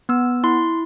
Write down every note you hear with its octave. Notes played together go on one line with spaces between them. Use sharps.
B3 E6
E4 C6